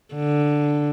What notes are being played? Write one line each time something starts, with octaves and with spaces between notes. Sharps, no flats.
D3